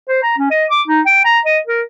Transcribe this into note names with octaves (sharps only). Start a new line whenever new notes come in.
C5
A#5
C#4
D#5
D6
D#4
G5
A#5
D#5
A#4